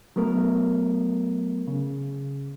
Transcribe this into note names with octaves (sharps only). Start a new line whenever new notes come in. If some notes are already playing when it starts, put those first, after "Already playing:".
F#3 A3 B3 A#4
C#3